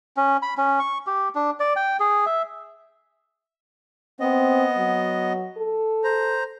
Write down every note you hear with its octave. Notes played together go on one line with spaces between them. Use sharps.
C#4
B5
C#4
C#6
G4
D4
D5
G5
G#4
E5
B3 C4 D#5
F#3
A4
C5 A#5